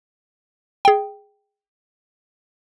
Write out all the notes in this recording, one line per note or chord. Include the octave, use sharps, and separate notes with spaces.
G#4 G5